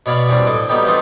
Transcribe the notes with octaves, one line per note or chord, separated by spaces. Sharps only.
B2 C#5 D5 F5 B5
E3 G3 C4 D4
A2 D#5 D6
F#3 G3 B3 D#4 G4
E3 A3 C4 D#4 F4